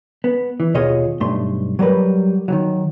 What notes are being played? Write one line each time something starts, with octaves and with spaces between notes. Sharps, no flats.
B3
E3
D#2 B2 F4 G#4 C#5 D#5
B1 G2 A3 C6
F#3 G3 A#4 B4
D#3 E3 F#3